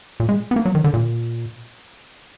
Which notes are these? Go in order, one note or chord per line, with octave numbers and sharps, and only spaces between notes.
A#2
G#3
B3
A#3
F#3
D#3
D3
A#2